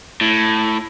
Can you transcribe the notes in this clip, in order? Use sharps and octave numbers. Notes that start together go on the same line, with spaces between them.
A2